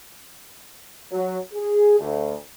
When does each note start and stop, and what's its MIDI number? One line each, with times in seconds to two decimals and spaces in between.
1.12 1.38 54
1.53 1.98 68
1.99 2.35 38